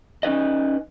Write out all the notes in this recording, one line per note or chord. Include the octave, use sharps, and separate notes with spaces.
C#4 D#4 B4 D#5